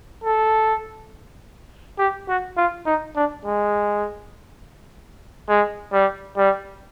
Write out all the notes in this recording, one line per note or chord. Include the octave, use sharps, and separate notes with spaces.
A4
G4
F#4
F4
D#4
D4
G#3
G#3
G3
G3